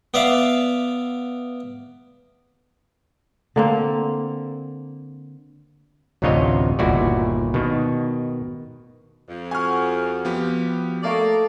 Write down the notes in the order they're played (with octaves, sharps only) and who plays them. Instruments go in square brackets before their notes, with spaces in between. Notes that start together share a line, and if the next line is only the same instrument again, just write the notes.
[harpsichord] B3 D5 E5 F5
[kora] D3 A#3 C4
[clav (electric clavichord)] A1 D2 C3 F4 C#5 D#5
G1 D#2 A#2 E4 F#4 D5
B2 D#3
[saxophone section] F2
[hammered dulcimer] F#4 [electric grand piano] G#5 F6
[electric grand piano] F3 B3 G4
[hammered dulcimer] A3 D#4 F5 [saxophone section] A#3 D5